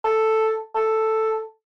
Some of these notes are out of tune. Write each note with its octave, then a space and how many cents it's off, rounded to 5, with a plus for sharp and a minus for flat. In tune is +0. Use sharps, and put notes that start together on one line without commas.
A4 +0
A4 +0